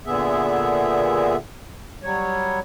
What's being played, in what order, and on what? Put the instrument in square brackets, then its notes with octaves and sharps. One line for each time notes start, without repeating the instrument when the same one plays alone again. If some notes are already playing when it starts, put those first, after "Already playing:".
[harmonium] A#2 D3 B3 G#4 E5
F#3 G3 C#5